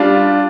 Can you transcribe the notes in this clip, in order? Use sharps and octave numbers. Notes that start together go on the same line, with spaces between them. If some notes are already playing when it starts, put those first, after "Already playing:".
Already playing: G3 D4 F4